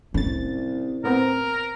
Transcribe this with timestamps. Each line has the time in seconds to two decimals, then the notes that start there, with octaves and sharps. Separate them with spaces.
0.14 G1 C2 A2 C#4 A6
1.04 A2 B3 C4 A#4